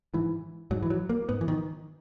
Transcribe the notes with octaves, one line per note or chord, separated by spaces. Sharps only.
G#2 E3
G#2 F#3
E3
F#3
A#3
G#2 B3
E3
D#3